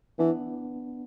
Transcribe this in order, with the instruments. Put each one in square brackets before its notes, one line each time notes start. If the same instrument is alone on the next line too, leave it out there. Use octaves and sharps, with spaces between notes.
[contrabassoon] E3 [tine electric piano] B3 D4